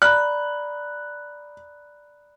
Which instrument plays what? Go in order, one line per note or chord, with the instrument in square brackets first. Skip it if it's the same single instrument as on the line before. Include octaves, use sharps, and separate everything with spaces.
[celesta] D5 A#5 B5 [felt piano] F#6